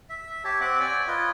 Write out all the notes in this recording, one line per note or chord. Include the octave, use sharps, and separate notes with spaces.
E5
G4 C#5 E5 A5
C4 E5 F#5 D6
C#5 D5 G5 G#5
F4 B4 C#5 D#5